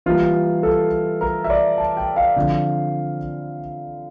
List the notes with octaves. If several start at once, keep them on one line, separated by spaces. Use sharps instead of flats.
E3 G3 A#3 F4
A4
A#4
E5
D5
A5
G5
F5
D3 F3 C4